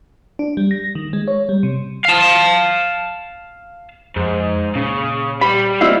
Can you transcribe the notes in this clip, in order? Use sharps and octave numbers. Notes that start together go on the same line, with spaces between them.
D4
G3
A#6
D#3
G#3
C#5
G3
C3
F5 A5
F2 G#2
A#2 C#3
G3 B5
C4 E4 F4 D5 D#5 F5